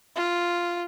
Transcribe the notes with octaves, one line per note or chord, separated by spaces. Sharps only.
F4